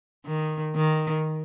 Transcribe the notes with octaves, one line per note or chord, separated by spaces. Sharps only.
D#3
D#3